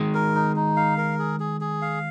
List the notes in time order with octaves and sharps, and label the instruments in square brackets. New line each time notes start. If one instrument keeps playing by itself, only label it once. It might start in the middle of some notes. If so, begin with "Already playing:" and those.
Already playing: [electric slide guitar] D#3 G#3
[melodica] A#4
D#4
D#4
F5
A#4
G#4
G#4
G#4
F5